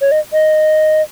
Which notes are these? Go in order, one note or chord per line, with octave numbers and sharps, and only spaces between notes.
C#5
D#5
D#5